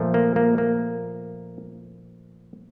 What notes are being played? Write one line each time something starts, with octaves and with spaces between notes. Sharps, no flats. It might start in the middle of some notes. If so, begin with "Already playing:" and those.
Already playing: A#2 F3 A3
A#3
A#3
A#3